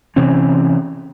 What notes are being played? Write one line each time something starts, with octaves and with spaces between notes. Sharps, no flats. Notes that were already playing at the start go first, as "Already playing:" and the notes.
C3 E3 C4 C#4